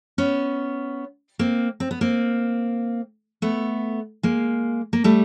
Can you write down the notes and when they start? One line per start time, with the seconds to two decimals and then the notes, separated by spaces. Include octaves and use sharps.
0.18 B3 C#4
1.39 A#3 C4
1.80 C4
1.91 B3
2.01 A#3 C4
3.42 A3 B3
4.23 G#3 A#3
4.93 A#3
5.04 G3 A3